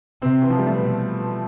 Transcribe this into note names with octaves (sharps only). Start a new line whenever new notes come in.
C3 C4
E3
F3
G3
A3
B2 B3